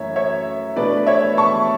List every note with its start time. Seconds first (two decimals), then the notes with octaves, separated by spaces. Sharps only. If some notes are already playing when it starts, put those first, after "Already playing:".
Already playing: F#2 E3 A3 C#5 E5
0.16 C#5 E5
0.76 B2 A3 D4 B4 D5
1.07 C#5 E5
1.37 A5 C#6